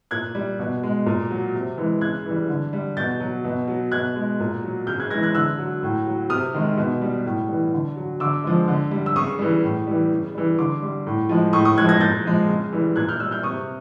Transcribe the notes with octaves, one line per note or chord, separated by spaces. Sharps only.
A#2 F#6 G#6
G3
B2
G#3
A#2
F#3
C3
E3 G#3
C#3 F#6 G#6
E3
G3
D3
G3
B2 G6 A6
F#3
B2
F#3
B2 F#6 G#6
G#3
A#2
F#3
C#3 F6 G6
F#6 G#6
E3 G#3 G#6 A#6
F#6 G#6
D3 E6 F#6
F#3
A2
F#3
C3 D#6 F6
D#3 G#3
B2
G3
A2
E3 G3
D3
F#3
D3 D6 E6
F3 G#3
D3
G3
E6
C#3 C#6 D#6
E3 G3
A2
E3 G3
C#3
E3 G3
D3 C6 D6
G3
A2
F3 G#3
A2 C#6 D#6
C#6 D#6
F3 G#3 F#6 G#6
G#6 A#6
A#2 G6 A6
F3 G#3
C#3
E3 G3
A#2 F#6 G#6
F6 G6
G3 E6 F#6
F6 G6
C3 C#6 D#6